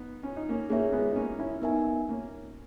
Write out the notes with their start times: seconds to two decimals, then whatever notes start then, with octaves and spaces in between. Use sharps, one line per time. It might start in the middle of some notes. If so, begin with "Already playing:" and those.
Already playing: B3 D#4
0.23 C#4
0.36 D#4
0.49 A#3 C#4
0.70 A#3 C#4 G#4 C#5 E5
0.92 G#3 B3
1.11 D#4
1.16 A#3 C#4
1.39 C#4 E4
1.62 B3 D#4 A#4 E5 G#5
2.09 A#3 C#4